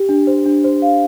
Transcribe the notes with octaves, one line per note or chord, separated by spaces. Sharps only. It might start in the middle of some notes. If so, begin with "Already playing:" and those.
Already playing: G4
D4
C5
D4
C5
F5